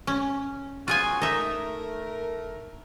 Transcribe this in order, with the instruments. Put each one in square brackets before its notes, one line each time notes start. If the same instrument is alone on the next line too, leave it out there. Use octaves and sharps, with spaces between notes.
[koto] C#4
[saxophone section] F#3 B3 F#4 [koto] F4 G#4 G#5
[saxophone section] A3 A#4 [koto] D#4 E5